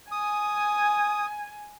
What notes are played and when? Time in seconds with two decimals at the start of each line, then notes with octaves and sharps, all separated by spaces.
0.12 G#5 D#6